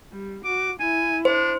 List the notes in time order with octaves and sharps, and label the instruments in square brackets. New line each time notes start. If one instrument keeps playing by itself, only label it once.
[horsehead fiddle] G3
[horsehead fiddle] F#4 [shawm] D6
[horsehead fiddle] E4 [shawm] G#5
[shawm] D4 [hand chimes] C5